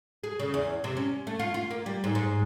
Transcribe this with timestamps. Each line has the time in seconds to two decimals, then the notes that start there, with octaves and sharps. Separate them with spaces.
0.24 G#4
0.40 C#3
0.54 E2
0.84 C3
0.97 C#4
1.27 A3
1.39 F4
1.54 F4
1.71 A#3
1.86 G3
2.04 G#2
2.15 G#2